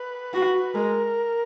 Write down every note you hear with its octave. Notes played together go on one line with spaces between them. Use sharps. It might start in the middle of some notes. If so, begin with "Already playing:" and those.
Already playing: B4
F#4
G#3 A#4